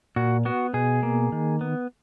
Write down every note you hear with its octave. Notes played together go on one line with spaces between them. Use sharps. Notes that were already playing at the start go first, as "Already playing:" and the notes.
A#2 F#4
B3 F#4
B2 G#4
A#3
D#3
B3